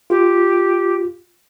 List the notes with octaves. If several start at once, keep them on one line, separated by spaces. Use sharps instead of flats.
F4 G4